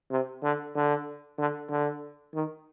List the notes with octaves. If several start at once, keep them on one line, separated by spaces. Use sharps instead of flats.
C3
D3
D3
D3
D3
D#3